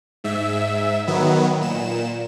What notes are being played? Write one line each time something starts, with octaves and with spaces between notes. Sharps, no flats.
G#2 E5
D#3 F#3 B3
A#2 E7